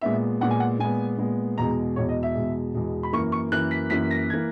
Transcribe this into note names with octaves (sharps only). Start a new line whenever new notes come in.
A#2 G#3 B3 E5
A#2 G#3 B3 F#5
G#5
F#5
A#2 G#3 B3 G#5
A#2 G#3 B3
E2 B2 G#3 A#5
E2 B2 G#3 C#5
D#5
E5
E2 B2 G#3
E2 B2 G#3
B5
F#2 E3 A#3 C#6
C#6
F#2 E3 A#3 F#6
B6
F#2 E3 A#3 B6
A#6
E3 A#3 G#6